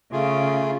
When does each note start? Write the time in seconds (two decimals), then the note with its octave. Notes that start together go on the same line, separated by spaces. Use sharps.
0.12 C#3 A3 F4 G#4